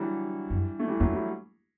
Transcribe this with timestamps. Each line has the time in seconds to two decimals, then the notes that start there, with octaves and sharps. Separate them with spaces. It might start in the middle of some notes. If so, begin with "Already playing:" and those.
Already playing: D3 E3 F#3 G3
0.50 F#2
0.79 A3
0.87 E3 G3
1.00 E2 F#3 A3
1.12 E3 G3